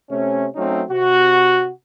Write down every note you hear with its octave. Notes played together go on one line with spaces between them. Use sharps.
C3 A3 C#4
F#3 A3 C4 C#4 D#4
C3 F#4